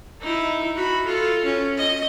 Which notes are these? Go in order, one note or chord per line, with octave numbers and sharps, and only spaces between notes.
D#4 E4
F#4 B5
F4 A4
C#4
D#5